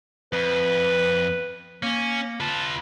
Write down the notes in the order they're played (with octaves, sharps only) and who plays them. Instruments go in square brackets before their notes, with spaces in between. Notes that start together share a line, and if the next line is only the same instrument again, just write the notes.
[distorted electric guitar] F2 [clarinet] B4
[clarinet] A#3 [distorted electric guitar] C#4
[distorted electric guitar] F4 B4 [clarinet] A5